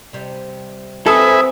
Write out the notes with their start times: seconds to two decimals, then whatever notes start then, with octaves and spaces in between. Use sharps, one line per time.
0.13 C3 G3
1.06 F#3 C4 A4 B4 C#5 E5 G#5 D#6